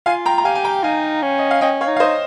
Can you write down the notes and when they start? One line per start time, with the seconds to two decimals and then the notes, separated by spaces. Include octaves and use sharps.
0.06 F4 F5 G#5
0.26 G5 A#5
0.38 A#5
0.45 G4 F5 G#5
0.55 G#5
0.64 G5 A#5
0.84 D#4 F5 G#5
1.22 C#4
1.38 D#5
1.51 F5
1.61 C#4 D#5 G5
1.81 C#5 F5
1.88 D#4
1.96 F5
2.00 C5 D#5